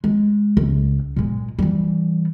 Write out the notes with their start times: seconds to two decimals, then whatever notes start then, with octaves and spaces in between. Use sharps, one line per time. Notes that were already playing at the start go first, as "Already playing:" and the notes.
0.04 G#3
0.57 C#2
1.17 A#2 G#3
1.59 E3 G3